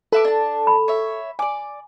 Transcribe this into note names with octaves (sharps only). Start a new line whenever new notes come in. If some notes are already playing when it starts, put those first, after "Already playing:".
A4 B4 E5 D6
D4 A5
B5
C#5 E5
D5 G#5 D6